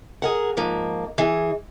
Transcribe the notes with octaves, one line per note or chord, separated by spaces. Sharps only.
G#4 A#4 F#5
G#2 F3 A#3
E3 G#4